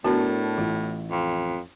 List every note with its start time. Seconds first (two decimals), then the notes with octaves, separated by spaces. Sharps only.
0.04 A2 B3 D4 F#4 A#4 A5
0.58 A1 F4
1.11 F2